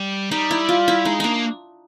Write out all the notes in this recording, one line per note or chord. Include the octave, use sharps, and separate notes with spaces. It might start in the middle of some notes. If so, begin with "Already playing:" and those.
Already playing: G3
G3 D#4
E4
F4
E4
G#3 D#4
A#3 D4 D#4